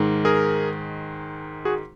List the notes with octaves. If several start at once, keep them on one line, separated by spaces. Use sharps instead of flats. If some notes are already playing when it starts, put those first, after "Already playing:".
Already playing: G#2 D#3 G#3
G#4 A#4
F#4 G#4